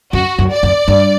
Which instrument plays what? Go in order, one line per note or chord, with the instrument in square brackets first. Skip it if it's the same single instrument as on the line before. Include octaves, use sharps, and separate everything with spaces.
[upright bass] F#2 [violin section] F#4
[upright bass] F#2
[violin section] D5
[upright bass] F#2
G2